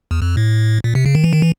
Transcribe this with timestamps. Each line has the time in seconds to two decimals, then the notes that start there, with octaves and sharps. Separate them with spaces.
0.11 E2
0.22 F2
0.37 A2
0.84 A#2
0.95 C3
1.06 C#3
1.15 D#3
1.24 E3
1.33 D#3
1.42 E3